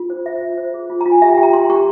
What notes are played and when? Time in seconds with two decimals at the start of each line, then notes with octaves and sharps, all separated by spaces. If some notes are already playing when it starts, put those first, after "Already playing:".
Already playing: F4
0.10 C5
0.26 C5 E5
0.42 F4
0.57 C5
0.74 G#4
0.90 F4
1.01 A#5
1.06 F4
1.12 G#5
1.22 G4 E5
1.32 G5
1.37 G4
1.43 A#5
1.53 G4 C6
1.70 G4 C#6